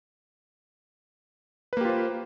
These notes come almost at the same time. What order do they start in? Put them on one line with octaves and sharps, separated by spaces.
B4 A#3 G4 F4 C5